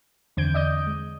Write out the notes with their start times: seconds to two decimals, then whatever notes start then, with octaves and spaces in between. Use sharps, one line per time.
0.37 E2 D3 C4 G6 G#6 D7
0.54 D5 D#5 D#6 G6
0.87 G#3